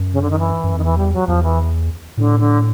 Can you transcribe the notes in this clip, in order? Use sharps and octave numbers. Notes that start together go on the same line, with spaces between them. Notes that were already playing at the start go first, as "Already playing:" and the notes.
Already playing: F#2
C#3
D3
D#3
E3
F#2
F2 D#3
E2 E3
G3
F#3
E2 F3
E3
A2 D3
D3